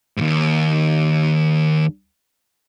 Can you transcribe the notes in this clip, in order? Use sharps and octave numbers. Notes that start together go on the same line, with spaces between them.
D#2 G#2